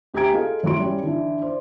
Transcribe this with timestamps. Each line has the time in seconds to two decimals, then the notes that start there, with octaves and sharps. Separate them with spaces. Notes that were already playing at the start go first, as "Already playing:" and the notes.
0.14 D2 G4 G#5 A#5 G#6 D7
0.33 F4 G#4 A4 D#5 F5
0.63 A2 F#3 E4 F#4 C6 D7
0.77 G3 C#4
1.03 D3 E3
1.42 C5 D5